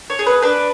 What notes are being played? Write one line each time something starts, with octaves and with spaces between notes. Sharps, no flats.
C#5
G#4
B4
D4 B4